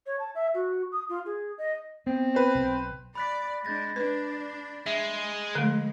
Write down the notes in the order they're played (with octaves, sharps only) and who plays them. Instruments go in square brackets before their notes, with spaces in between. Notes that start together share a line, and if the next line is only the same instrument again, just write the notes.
[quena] C#5
A5
E5
F#4
D#6
F4
G#4
D#5
[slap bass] B3 [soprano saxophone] C4
[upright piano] B4 C5
[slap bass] B1
[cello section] D5 [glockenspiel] B5 F#6 B6
[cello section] G#3 D4 [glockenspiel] G6 A6 A#6
[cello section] D4 [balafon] B4
[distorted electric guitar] G#3 [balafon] E5
[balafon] D3 A3 [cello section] F3 G#3